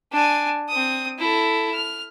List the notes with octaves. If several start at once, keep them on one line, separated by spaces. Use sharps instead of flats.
D4 G#5
C4 D#6
E4 A4
F6